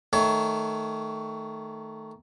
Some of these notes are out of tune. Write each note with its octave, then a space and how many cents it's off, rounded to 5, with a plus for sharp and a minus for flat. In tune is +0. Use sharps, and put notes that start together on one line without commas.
D#3 +0 A3 +0 C#5 +25